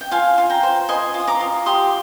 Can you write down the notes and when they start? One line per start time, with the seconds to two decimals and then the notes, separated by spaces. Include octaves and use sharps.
0.01 G5
0.11 F4 F5 G#5
0.38 F4
0.50 G5 A#5
0.63 C5
0.89 D#5 G#5 C6
1.14 F4
1.20 D#6
1.27 A#5 D6
1.40 F4
1.66 G4 C6 D#6